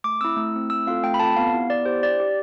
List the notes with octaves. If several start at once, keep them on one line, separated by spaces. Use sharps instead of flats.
A3 D6
C4 E4 E6
A3
C4 E4
A3 E6
C4 F4 A4 F5
A3 G5
B5
C4 F4 A4 A5
B3 F5
E4 G4
B3 D5
E4 G4 C5
D4 D5
G4